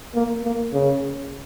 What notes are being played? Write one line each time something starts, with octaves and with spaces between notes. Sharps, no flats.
A#3
A#3
C#3